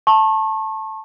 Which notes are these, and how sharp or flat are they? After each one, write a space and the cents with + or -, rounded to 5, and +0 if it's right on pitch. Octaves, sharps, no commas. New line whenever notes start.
A5 +0 C#6 -35